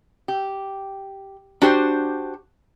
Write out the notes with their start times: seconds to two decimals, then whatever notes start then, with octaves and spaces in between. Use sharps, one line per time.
0.28 G4
1.62 D4 F#4 G4 C5